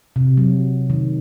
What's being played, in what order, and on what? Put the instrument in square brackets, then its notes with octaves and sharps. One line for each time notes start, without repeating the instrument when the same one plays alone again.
[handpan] C3
F#3
D#3